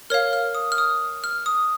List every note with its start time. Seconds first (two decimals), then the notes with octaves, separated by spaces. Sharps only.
0.10 A#4 C#5 F5 F6
0.33 F6
0.55 D#6
0.72 F6
0.78 D#6
1.24 F6
1.46 D#6